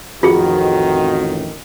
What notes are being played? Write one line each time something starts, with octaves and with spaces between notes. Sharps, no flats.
A1 F2 D#3 F4 F#4 G#4